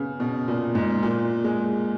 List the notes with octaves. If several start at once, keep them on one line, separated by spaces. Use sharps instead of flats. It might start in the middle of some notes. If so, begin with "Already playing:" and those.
Already playing: C#3 B3
B2
A#2
G#2
A#2
G#3